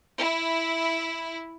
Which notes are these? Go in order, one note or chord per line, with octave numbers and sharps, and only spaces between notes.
E4